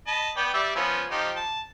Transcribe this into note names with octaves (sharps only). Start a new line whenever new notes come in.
D#5 A5 B5
B3 D5 G5
G3 D5 E5
F3 B3 C#4
F3 D#4 G4
A5